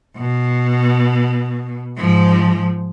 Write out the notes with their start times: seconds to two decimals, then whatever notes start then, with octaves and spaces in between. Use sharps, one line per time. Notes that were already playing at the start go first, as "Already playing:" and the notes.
0.17 B2
1.97 G#2 F3